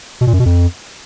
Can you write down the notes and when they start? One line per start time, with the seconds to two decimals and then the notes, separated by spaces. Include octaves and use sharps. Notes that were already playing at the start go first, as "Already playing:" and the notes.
0.21 B2
0.27 A#2
0.33 F#2
0.40 B2
0.46 F2